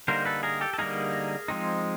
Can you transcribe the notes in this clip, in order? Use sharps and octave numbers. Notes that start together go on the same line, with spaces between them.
D3 G3 A#3 D#4 A#4 C5
A4 B4
G#4 A#4
G4 A4
A4
D3 G3 A#3 D#4 G#4 A#4
F3 G#3 C4 D#4